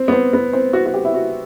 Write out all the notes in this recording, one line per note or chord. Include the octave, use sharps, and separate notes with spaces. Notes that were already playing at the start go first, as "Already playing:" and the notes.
Already playing: C4
B3
C4
B3
C4
F#4
F#4
G4
E4
F#4